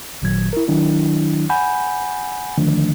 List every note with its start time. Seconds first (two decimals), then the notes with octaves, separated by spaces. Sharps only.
0.22 G#1 A#2 D#3 F#3 G#6
0.53 E4 A#4
0.68 D#3 F#3 D4 E4
1.50 F#5 G#5 B5 G6
2.58 D3 D#3 F3 A3 D4